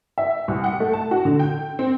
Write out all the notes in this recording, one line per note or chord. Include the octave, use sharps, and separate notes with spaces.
E5
C2
F#5
A3
A5
F#4
D3
G5
C4